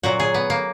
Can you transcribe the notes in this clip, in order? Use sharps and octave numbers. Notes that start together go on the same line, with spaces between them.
A#2 F#3 F#4
G#4
B3
A#3